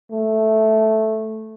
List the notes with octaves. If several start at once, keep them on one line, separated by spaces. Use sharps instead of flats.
A3